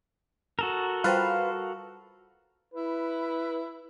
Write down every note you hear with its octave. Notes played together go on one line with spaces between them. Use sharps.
F#4 A4 A#4
G3 F4 B4 C5 F5 G5
E4 B4